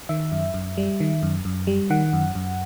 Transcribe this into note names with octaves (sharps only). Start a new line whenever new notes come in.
D#3 E5
F#2
F#2
G3
D#3
F#2
F#2
G3
D#3 F#5
F#2
F#2